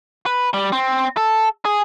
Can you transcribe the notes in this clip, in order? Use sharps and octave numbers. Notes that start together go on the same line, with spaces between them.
B4
G3
C4
A4
G#4